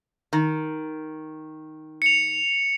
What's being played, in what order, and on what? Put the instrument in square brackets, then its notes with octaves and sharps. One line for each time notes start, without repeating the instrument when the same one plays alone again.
[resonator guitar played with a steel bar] D#3
[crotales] C#7 F7